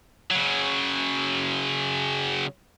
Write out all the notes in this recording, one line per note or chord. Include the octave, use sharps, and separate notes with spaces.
C#3 F#3